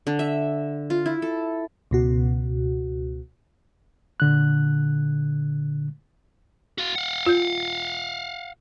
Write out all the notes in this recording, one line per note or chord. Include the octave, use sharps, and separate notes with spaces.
D3
E5
F4
E4
A4
C#2 B2 F#4
A#2 D3 F#6
F#4 F5
F5 F#5
F4 G6